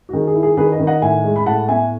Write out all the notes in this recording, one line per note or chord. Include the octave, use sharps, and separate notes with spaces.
F#4
D#3 G#4
G#4
E4
G#4
D#3 G#4 B4
B4 D#5
D#3
D#5 F#5
A2 E5 G#5
G#3
B5
A2 F#5 A5
B3 E5 G#5